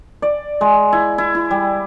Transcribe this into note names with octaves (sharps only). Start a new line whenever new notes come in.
D5
G#3
E4
E4
E4
G3